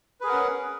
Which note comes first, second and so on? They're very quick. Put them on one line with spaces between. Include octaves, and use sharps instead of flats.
B4 G#4 A#4 F#5 C#4